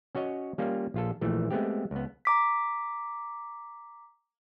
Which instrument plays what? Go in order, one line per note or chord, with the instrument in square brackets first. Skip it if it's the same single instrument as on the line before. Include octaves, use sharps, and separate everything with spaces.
[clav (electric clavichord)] C#4 F#4 C#5 D#5
G3 A#3 C#4 F4
A#1 F4 A4
A#1 A#2 E3 A3
G#3 A3 B3 C4 G4
C#2 B3
[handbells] A#5 D6 B6